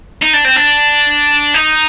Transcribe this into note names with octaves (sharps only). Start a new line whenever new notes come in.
D#4
D4
C4
D4
D#4